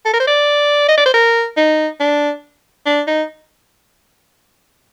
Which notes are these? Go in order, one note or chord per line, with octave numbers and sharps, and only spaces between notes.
A4
A#4
C5
D5
D#5
D5
C5
A#4
D#4
D4
D4
D#4